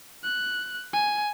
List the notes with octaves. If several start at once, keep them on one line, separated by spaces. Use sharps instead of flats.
F#6
G#5